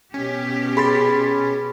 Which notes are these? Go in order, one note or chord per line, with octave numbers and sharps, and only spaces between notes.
B2 C#4 G4
G#4 B5 C6 A6